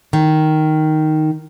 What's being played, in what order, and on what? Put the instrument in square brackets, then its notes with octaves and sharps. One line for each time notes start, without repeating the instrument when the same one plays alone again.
[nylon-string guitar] D#3